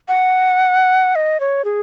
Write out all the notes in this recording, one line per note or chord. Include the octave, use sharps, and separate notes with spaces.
F#5
D#5
C#5
G#4